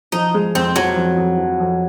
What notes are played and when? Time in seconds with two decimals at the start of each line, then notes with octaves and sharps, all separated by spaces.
0.12 F3 D#4
0.34 G#3
0.55 F2 C4
0.75 F3 F#3
0.97 F2
1.17 F2
1.38 F3
1.60 F2